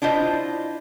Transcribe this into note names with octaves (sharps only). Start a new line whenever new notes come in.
D4 E4 F4 C5 D#5